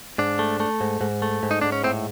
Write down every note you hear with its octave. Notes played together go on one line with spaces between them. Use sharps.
G#2 D4
A3
A3
G#2
G#2
A3
G#2
D#4
G#2 D4
C#4
A2 C4